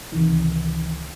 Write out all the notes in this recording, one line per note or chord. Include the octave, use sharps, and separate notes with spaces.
C#2 C3 D#3 E3